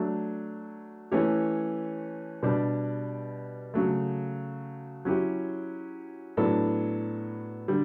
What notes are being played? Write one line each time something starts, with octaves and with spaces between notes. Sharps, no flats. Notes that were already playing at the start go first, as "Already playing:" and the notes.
Already playing: F#3 A3 D4
E3 A3 C#4 G4 C#5
B2 G3 D4 G4 D5
C#3 F#3 A3
F#3 C#4 E4 G4
A2 F#3 B3 D4 A4
D3 G3